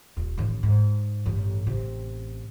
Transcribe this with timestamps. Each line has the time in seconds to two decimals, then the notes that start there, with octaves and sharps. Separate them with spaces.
0.17 D#1
0.38 A1 D#3
0.63 G#2
1.26 A1 G2
1.67 A1 C3